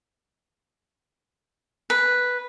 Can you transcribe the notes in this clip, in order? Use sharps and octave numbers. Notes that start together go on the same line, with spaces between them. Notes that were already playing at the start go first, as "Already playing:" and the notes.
B4